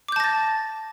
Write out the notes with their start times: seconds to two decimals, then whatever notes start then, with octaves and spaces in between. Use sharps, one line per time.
0.08 D6
0.12 G6
0.16 A5
0.20 A#6
0.24 A6